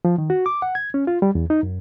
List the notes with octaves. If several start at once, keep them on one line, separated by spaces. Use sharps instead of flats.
F3
D#3
F#4
D6
F#5
G#6
C#4
F4
G3
E2
D#4
F#2